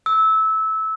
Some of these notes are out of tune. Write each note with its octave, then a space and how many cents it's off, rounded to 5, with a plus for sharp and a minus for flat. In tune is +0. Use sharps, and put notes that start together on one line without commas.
E6 -20